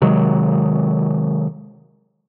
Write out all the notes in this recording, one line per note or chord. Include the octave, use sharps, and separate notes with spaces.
C3 D#3 F#3 G#3